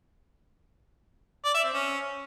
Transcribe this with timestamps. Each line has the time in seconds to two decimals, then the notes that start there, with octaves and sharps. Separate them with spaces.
1.45 D5
1.54 E5
1.64 C4
1.73 C#4